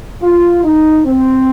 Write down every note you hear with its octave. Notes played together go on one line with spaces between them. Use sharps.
F4
D#4
C4